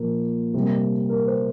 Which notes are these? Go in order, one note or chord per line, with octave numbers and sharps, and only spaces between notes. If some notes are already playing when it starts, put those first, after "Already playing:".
Already playing: A#2 F3 A#3 A#4
C3 G3 A#3
A#4
C5